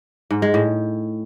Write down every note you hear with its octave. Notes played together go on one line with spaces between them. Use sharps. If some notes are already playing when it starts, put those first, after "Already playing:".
G#2
G#3
A2